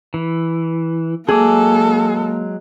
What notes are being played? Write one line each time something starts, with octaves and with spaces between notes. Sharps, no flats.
E3
F#3 G#3 A#3 G#4 A4 D6